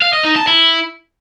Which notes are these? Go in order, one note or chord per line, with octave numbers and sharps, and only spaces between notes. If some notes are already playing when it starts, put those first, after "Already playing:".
F5
D#5
D#4
A5
E4